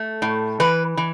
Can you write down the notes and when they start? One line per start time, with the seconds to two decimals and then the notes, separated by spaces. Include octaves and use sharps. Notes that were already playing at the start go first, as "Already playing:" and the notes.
Already playing: A3
0.22 A2
0.60 E3 B4
0.97 E3